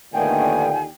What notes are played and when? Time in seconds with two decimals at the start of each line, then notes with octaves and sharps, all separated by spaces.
0.14 D#2 A#2 D3 D#3 A3 B3 G5 G#5